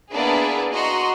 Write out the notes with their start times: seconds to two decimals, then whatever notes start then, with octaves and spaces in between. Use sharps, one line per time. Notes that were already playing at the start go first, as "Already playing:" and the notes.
0.11 A#3 B3 D4 E4 G#4 B4
0.71 F#4 D#5 A#5 C6